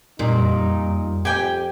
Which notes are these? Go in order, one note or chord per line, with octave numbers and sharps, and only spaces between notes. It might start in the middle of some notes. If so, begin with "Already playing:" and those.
F2 A#2 G3 D#4
F2 G4 G5 G#5